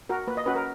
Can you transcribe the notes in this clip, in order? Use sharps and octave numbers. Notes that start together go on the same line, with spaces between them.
F#4 A#4
A#3 B4
D#5
C#4 F#4 B4
A#4